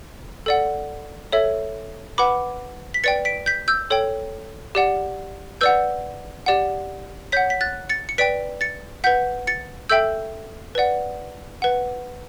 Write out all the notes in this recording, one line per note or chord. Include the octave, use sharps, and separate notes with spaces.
A4 D5 F#5
A4 C#5 E5
B4 F#5 B5 D6
B6
B4 D5 G5 A6 C#7
B6 D7
G6 B6
E6 G6
A4 C#5 G5
G4 D5 F#5
B4 D5 F#5 E6 G6
G4 D5 F#5
C#5 F#5 G6 B6
B6
F#6 A6
A6 C#7
C#7
B4 D5 G5 B6 D7
A6 C#7
B4 F#5 G6 B6
A6 C#7
A4 E5 G5 E6 G6
B4 D5 F#5
B4 F#5